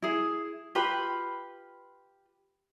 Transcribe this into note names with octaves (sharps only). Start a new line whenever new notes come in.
E4 G#4
F4 G4 B4 B5